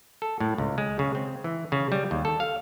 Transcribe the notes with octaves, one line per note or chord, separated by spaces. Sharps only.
A4
A2
C#2
G#3
C#3
C4
E3
C#3
G3
D#2
A4
F5